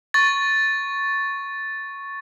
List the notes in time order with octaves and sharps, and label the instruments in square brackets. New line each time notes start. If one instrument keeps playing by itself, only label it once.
[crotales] C#6 A6